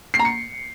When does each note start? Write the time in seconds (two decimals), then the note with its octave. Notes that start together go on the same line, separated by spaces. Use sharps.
0.14 C7
0.19 A#5
0.25 C#7